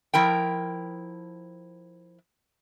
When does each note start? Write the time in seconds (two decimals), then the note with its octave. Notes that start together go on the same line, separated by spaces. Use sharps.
0.14 F3 E4 A#4 G5